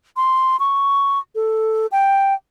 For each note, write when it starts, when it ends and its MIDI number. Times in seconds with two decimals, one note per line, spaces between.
0.17 0.59 84
0.60 1.19 85
1.35 1.87 69
1.92 2.34 79